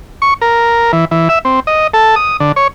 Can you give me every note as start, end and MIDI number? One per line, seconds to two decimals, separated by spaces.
0.22 0.34 85
0.41 0.92 70
0.93 1.05 52
1.11 1.28 52
1.29 1.39 76
1.45 1.60 60
1.67 1.87 75
1.94 2.15 69
2.16 2.37 87
2.40 2.52 50
2.56 2.68 73